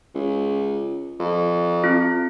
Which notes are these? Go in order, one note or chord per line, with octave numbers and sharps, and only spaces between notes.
C#2
F2
C4 F4